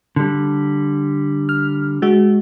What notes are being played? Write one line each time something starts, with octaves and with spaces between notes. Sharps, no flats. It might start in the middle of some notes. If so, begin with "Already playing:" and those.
D3 G3
F6
G#3 F#4